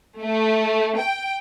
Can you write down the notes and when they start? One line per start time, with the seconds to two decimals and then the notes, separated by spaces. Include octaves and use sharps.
0.21 A3
0.97 G5